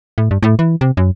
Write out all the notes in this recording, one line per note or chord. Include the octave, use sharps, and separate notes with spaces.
A2
G2
A2
E3
C3
F#2